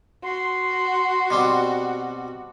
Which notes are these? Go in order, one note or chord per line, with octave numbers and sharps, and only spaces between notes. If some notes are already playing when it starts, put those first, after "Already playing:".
F#4 C6
B2 G3 C4